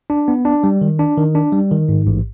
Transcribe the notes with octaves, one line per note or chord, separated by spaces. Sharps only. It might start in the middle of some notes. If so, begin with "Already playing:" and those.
D4
B3
D4
G3
D#3
D4
D#3
D4
G3
D#3
G#2
A1